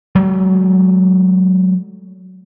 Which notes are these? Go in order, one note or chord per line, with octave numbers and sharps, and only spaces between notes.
F#3 G#3 A3